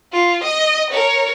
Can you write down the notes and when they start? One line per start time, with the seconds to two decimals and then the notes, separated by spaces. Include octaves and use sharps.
0.13 F4
0.43 D#5 D#6
0.90 A#4 C#5